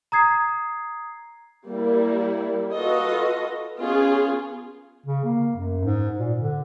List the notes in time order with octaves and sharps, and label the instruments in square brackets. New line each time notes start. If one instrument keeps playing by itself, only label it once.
[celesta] A#5 D#6 G#6 C7
[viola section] G3 A#3 E4
F4 F#4 A4 B4 D#5
B3 C#4 F4 G#4
[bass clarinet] C#3
A#3
F#2
G#2
A#2
D3